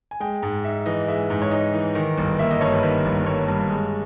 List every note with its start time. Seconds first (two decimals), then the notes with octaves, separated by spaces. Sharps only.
0.11 G#5
0.20 G#3 G5
0.43 G#2
0.64 D#4 E5
0.86 E3 D#5
1.08 G#3 E5
1.30 G#2
1.42 C#5
1.51 D#4 D#5
1.74 E3
1.95 D#3
2.18 G1
2.39 A#3 E5
2.51 D#5
2.61 G2 C#5
2.72 B4
2.83 D#3 B4
3.05 G1
3.27 A#3 C#5
3.48 G2
3.70 G#3